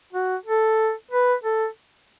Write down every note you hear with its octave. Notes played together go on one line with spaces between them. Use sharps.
F#4
A4
B4
A4